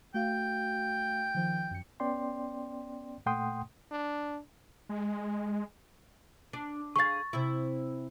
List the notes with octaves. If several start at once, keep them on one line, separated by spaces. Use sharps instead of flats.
A3 F#4 F5 G5
D#3 F3
F#2 C#7
B3 C#4 D5 G5 C6
A#2 A3 F#5 G5 C6 D#6
D4
G#3
D4
G#4 F5 C#6 A6
C3 E4